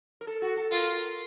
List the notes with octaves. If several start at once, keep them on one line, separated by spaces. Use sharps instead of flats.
A#4
A4
F#4
A4
F4 A#4